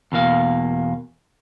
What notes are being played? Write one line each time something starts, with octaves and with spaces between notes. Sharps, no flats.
E2 B2 A#3 F5